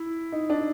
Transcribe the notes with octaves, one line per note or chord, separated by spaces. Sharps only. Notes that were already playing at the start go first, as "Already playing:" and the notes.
Already playing: E4
D#4
D4